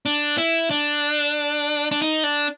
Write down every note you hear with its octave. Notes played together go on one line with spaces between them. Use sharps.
D4
E4
D4
D4
D#4
D4